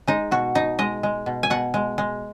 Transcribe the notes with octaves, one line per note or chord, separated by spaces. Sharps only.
G#3 D#4
B2 F#4
B2 D#4
G#3 D#5
G#3
B2
G#5
B2 F#5
G#3
G#3